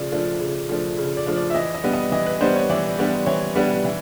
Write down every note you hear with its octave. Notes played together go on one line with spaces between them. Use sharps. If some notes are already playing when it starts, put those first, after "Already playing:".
Already playing: C#3 F3 A3 D5
F3 A3 D4
C#3
F3 A3 D4
C#3
D5
F3 A3 D4
D5
E5
E3 D#5
D#5
G3 B3 D4
D#5
E3 D#5
B4
G3 B3 D4 C5
C#5
E3 D5
G3 B3 D4
E3 C#5
G3 B3 D4
E3